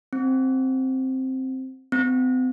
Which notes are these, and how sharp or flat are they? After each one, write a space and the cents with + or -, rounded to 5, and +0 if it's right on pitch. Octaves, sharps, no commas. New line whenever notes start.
C4 +0
C4 -40